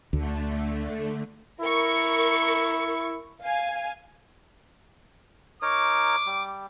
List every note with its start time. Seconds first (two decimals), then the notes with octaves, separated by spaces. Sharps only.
0.13 D2 D3 A3
1.60 E4 A#4 C#6
3.41 F5 G#5
5.62 D#4 A#4 C#5 D6
6.26 G3